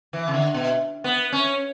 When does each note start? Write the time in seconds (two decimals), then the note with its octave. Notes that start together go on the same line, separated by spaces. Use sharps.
0.13 E3
0.28 C#3
0.34 D3
0.54 B2
1.04 B3
1.32 C#4